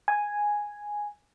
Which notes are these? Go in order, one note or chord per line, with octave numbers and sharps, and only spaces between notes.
G#5